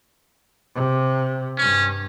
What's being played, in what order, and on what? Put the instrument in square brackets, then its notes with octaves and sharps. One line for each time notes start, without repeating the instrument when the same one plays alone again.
[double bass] C3
[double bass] G2 [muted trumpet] C#4